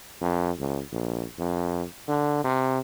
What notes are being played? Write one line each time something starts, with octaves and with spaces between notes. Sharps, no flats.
F2
C#2
A#1
F2
D3
C3